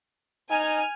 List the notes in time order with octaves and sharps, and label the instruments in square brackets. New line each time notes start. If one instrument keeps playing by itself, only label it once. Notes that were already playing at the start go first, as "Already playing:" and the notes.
[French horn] D#4 [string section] G#5 F6